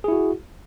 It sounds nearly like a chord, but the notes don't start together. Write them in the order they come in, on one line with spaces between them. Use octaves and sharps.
G#4 E4 F#4